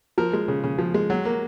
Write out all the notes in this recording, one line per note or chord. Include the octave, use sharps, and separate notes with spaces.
F3 A#4
G#3
C#3
C#3
F3
G#3
F#3
A#3